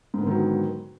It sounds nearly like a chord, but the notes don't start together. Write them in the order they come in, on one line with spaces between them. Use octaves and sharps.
G#2 D3 B3 D#3 F#3